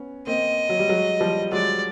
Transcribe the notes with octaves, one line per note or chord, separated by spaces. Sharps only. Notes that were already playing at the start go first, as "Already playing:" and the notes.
Already playing: B3 C#4
A#3 C4 D#5
F#3
G3
F#3 G#3
F3 G3
F#3 G#3 D5